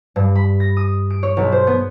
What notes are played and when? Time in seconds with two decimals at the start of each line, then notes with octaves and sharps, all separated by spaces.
0.16 G2
0.35 B5
0.60 A#6
0.77 D#6
1.10 D7
1.23 C#5
1.37 B1
1.52 C5
1.67 B3